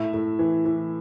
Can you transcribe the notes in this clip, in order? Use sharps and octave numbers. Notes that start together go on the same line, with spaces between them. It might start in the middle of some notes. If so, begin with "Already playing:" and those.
Already playing: A2 E5
A2
E3
E3